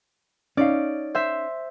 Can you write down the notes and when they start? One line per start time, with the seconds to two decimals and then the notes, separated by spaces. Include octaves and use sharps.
0.57 C#4 D#4 D5 F5
1.15 C5 E5